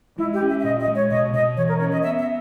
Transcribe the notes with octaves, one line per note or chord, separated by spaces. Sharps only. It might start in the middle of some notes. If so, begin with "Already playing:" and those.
G#3 E4
G4
C#4
E5
E5
A#2 D#5
D#5
G#3
C#5
B2 D#5
B2 D#5
E3 C#5
A#4
C#4 C#5
D#5
B3 E5
E5